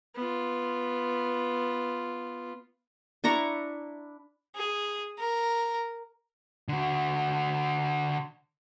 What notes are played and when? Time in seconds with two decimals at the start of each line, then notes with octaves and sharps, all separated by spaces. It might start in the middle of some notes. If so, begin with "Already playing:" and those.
0.15 B3 F4
3.24 D4 E4 A#5 C#6
4.55 G#4
5.18 A#4
6.68 D3 F#4